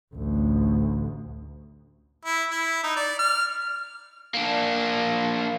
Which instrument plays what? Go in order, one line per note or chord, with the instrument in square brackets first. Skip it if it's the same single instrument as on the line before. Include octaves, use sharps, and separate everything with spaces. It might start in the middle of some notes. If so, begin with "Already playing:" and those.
[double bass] A1 D2
[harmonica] E4
E4
D#4
D5
F6
[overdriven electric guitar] A#3 D4